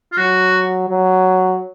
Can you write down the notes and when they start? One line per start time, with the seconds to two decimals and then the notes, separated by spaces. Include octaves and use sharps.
0.12 F4
0.18 F#3 F#4
0.89 F#3